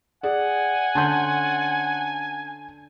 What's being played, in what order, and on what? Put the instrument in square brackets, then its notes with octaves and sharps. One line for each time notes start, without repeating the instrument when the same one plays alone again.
[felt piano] G#4 D5 [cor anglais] F#5 [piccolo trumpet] G#5
[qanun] D3 C#4 [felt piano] A5 C6 G6